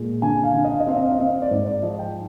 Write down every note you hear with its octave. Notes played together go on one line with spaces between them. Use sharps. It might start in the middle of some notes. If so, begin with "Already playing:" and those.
Already playing: A#2 G#3
D3 G#5
F5
D3
D#5
F5
D#5
C4 F5
D#5
F5
D#5
C4 F5
D#5
D5
G#2 C5
D5
F3 D#5
G5